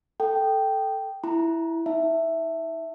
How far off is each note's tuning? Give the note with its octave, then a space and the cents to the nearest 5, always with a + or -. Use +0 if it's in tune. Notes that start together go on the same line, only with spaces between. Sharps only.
A4 +0 G5 -5
E4 +0 A#5 +40
D#4 +40 E5 +0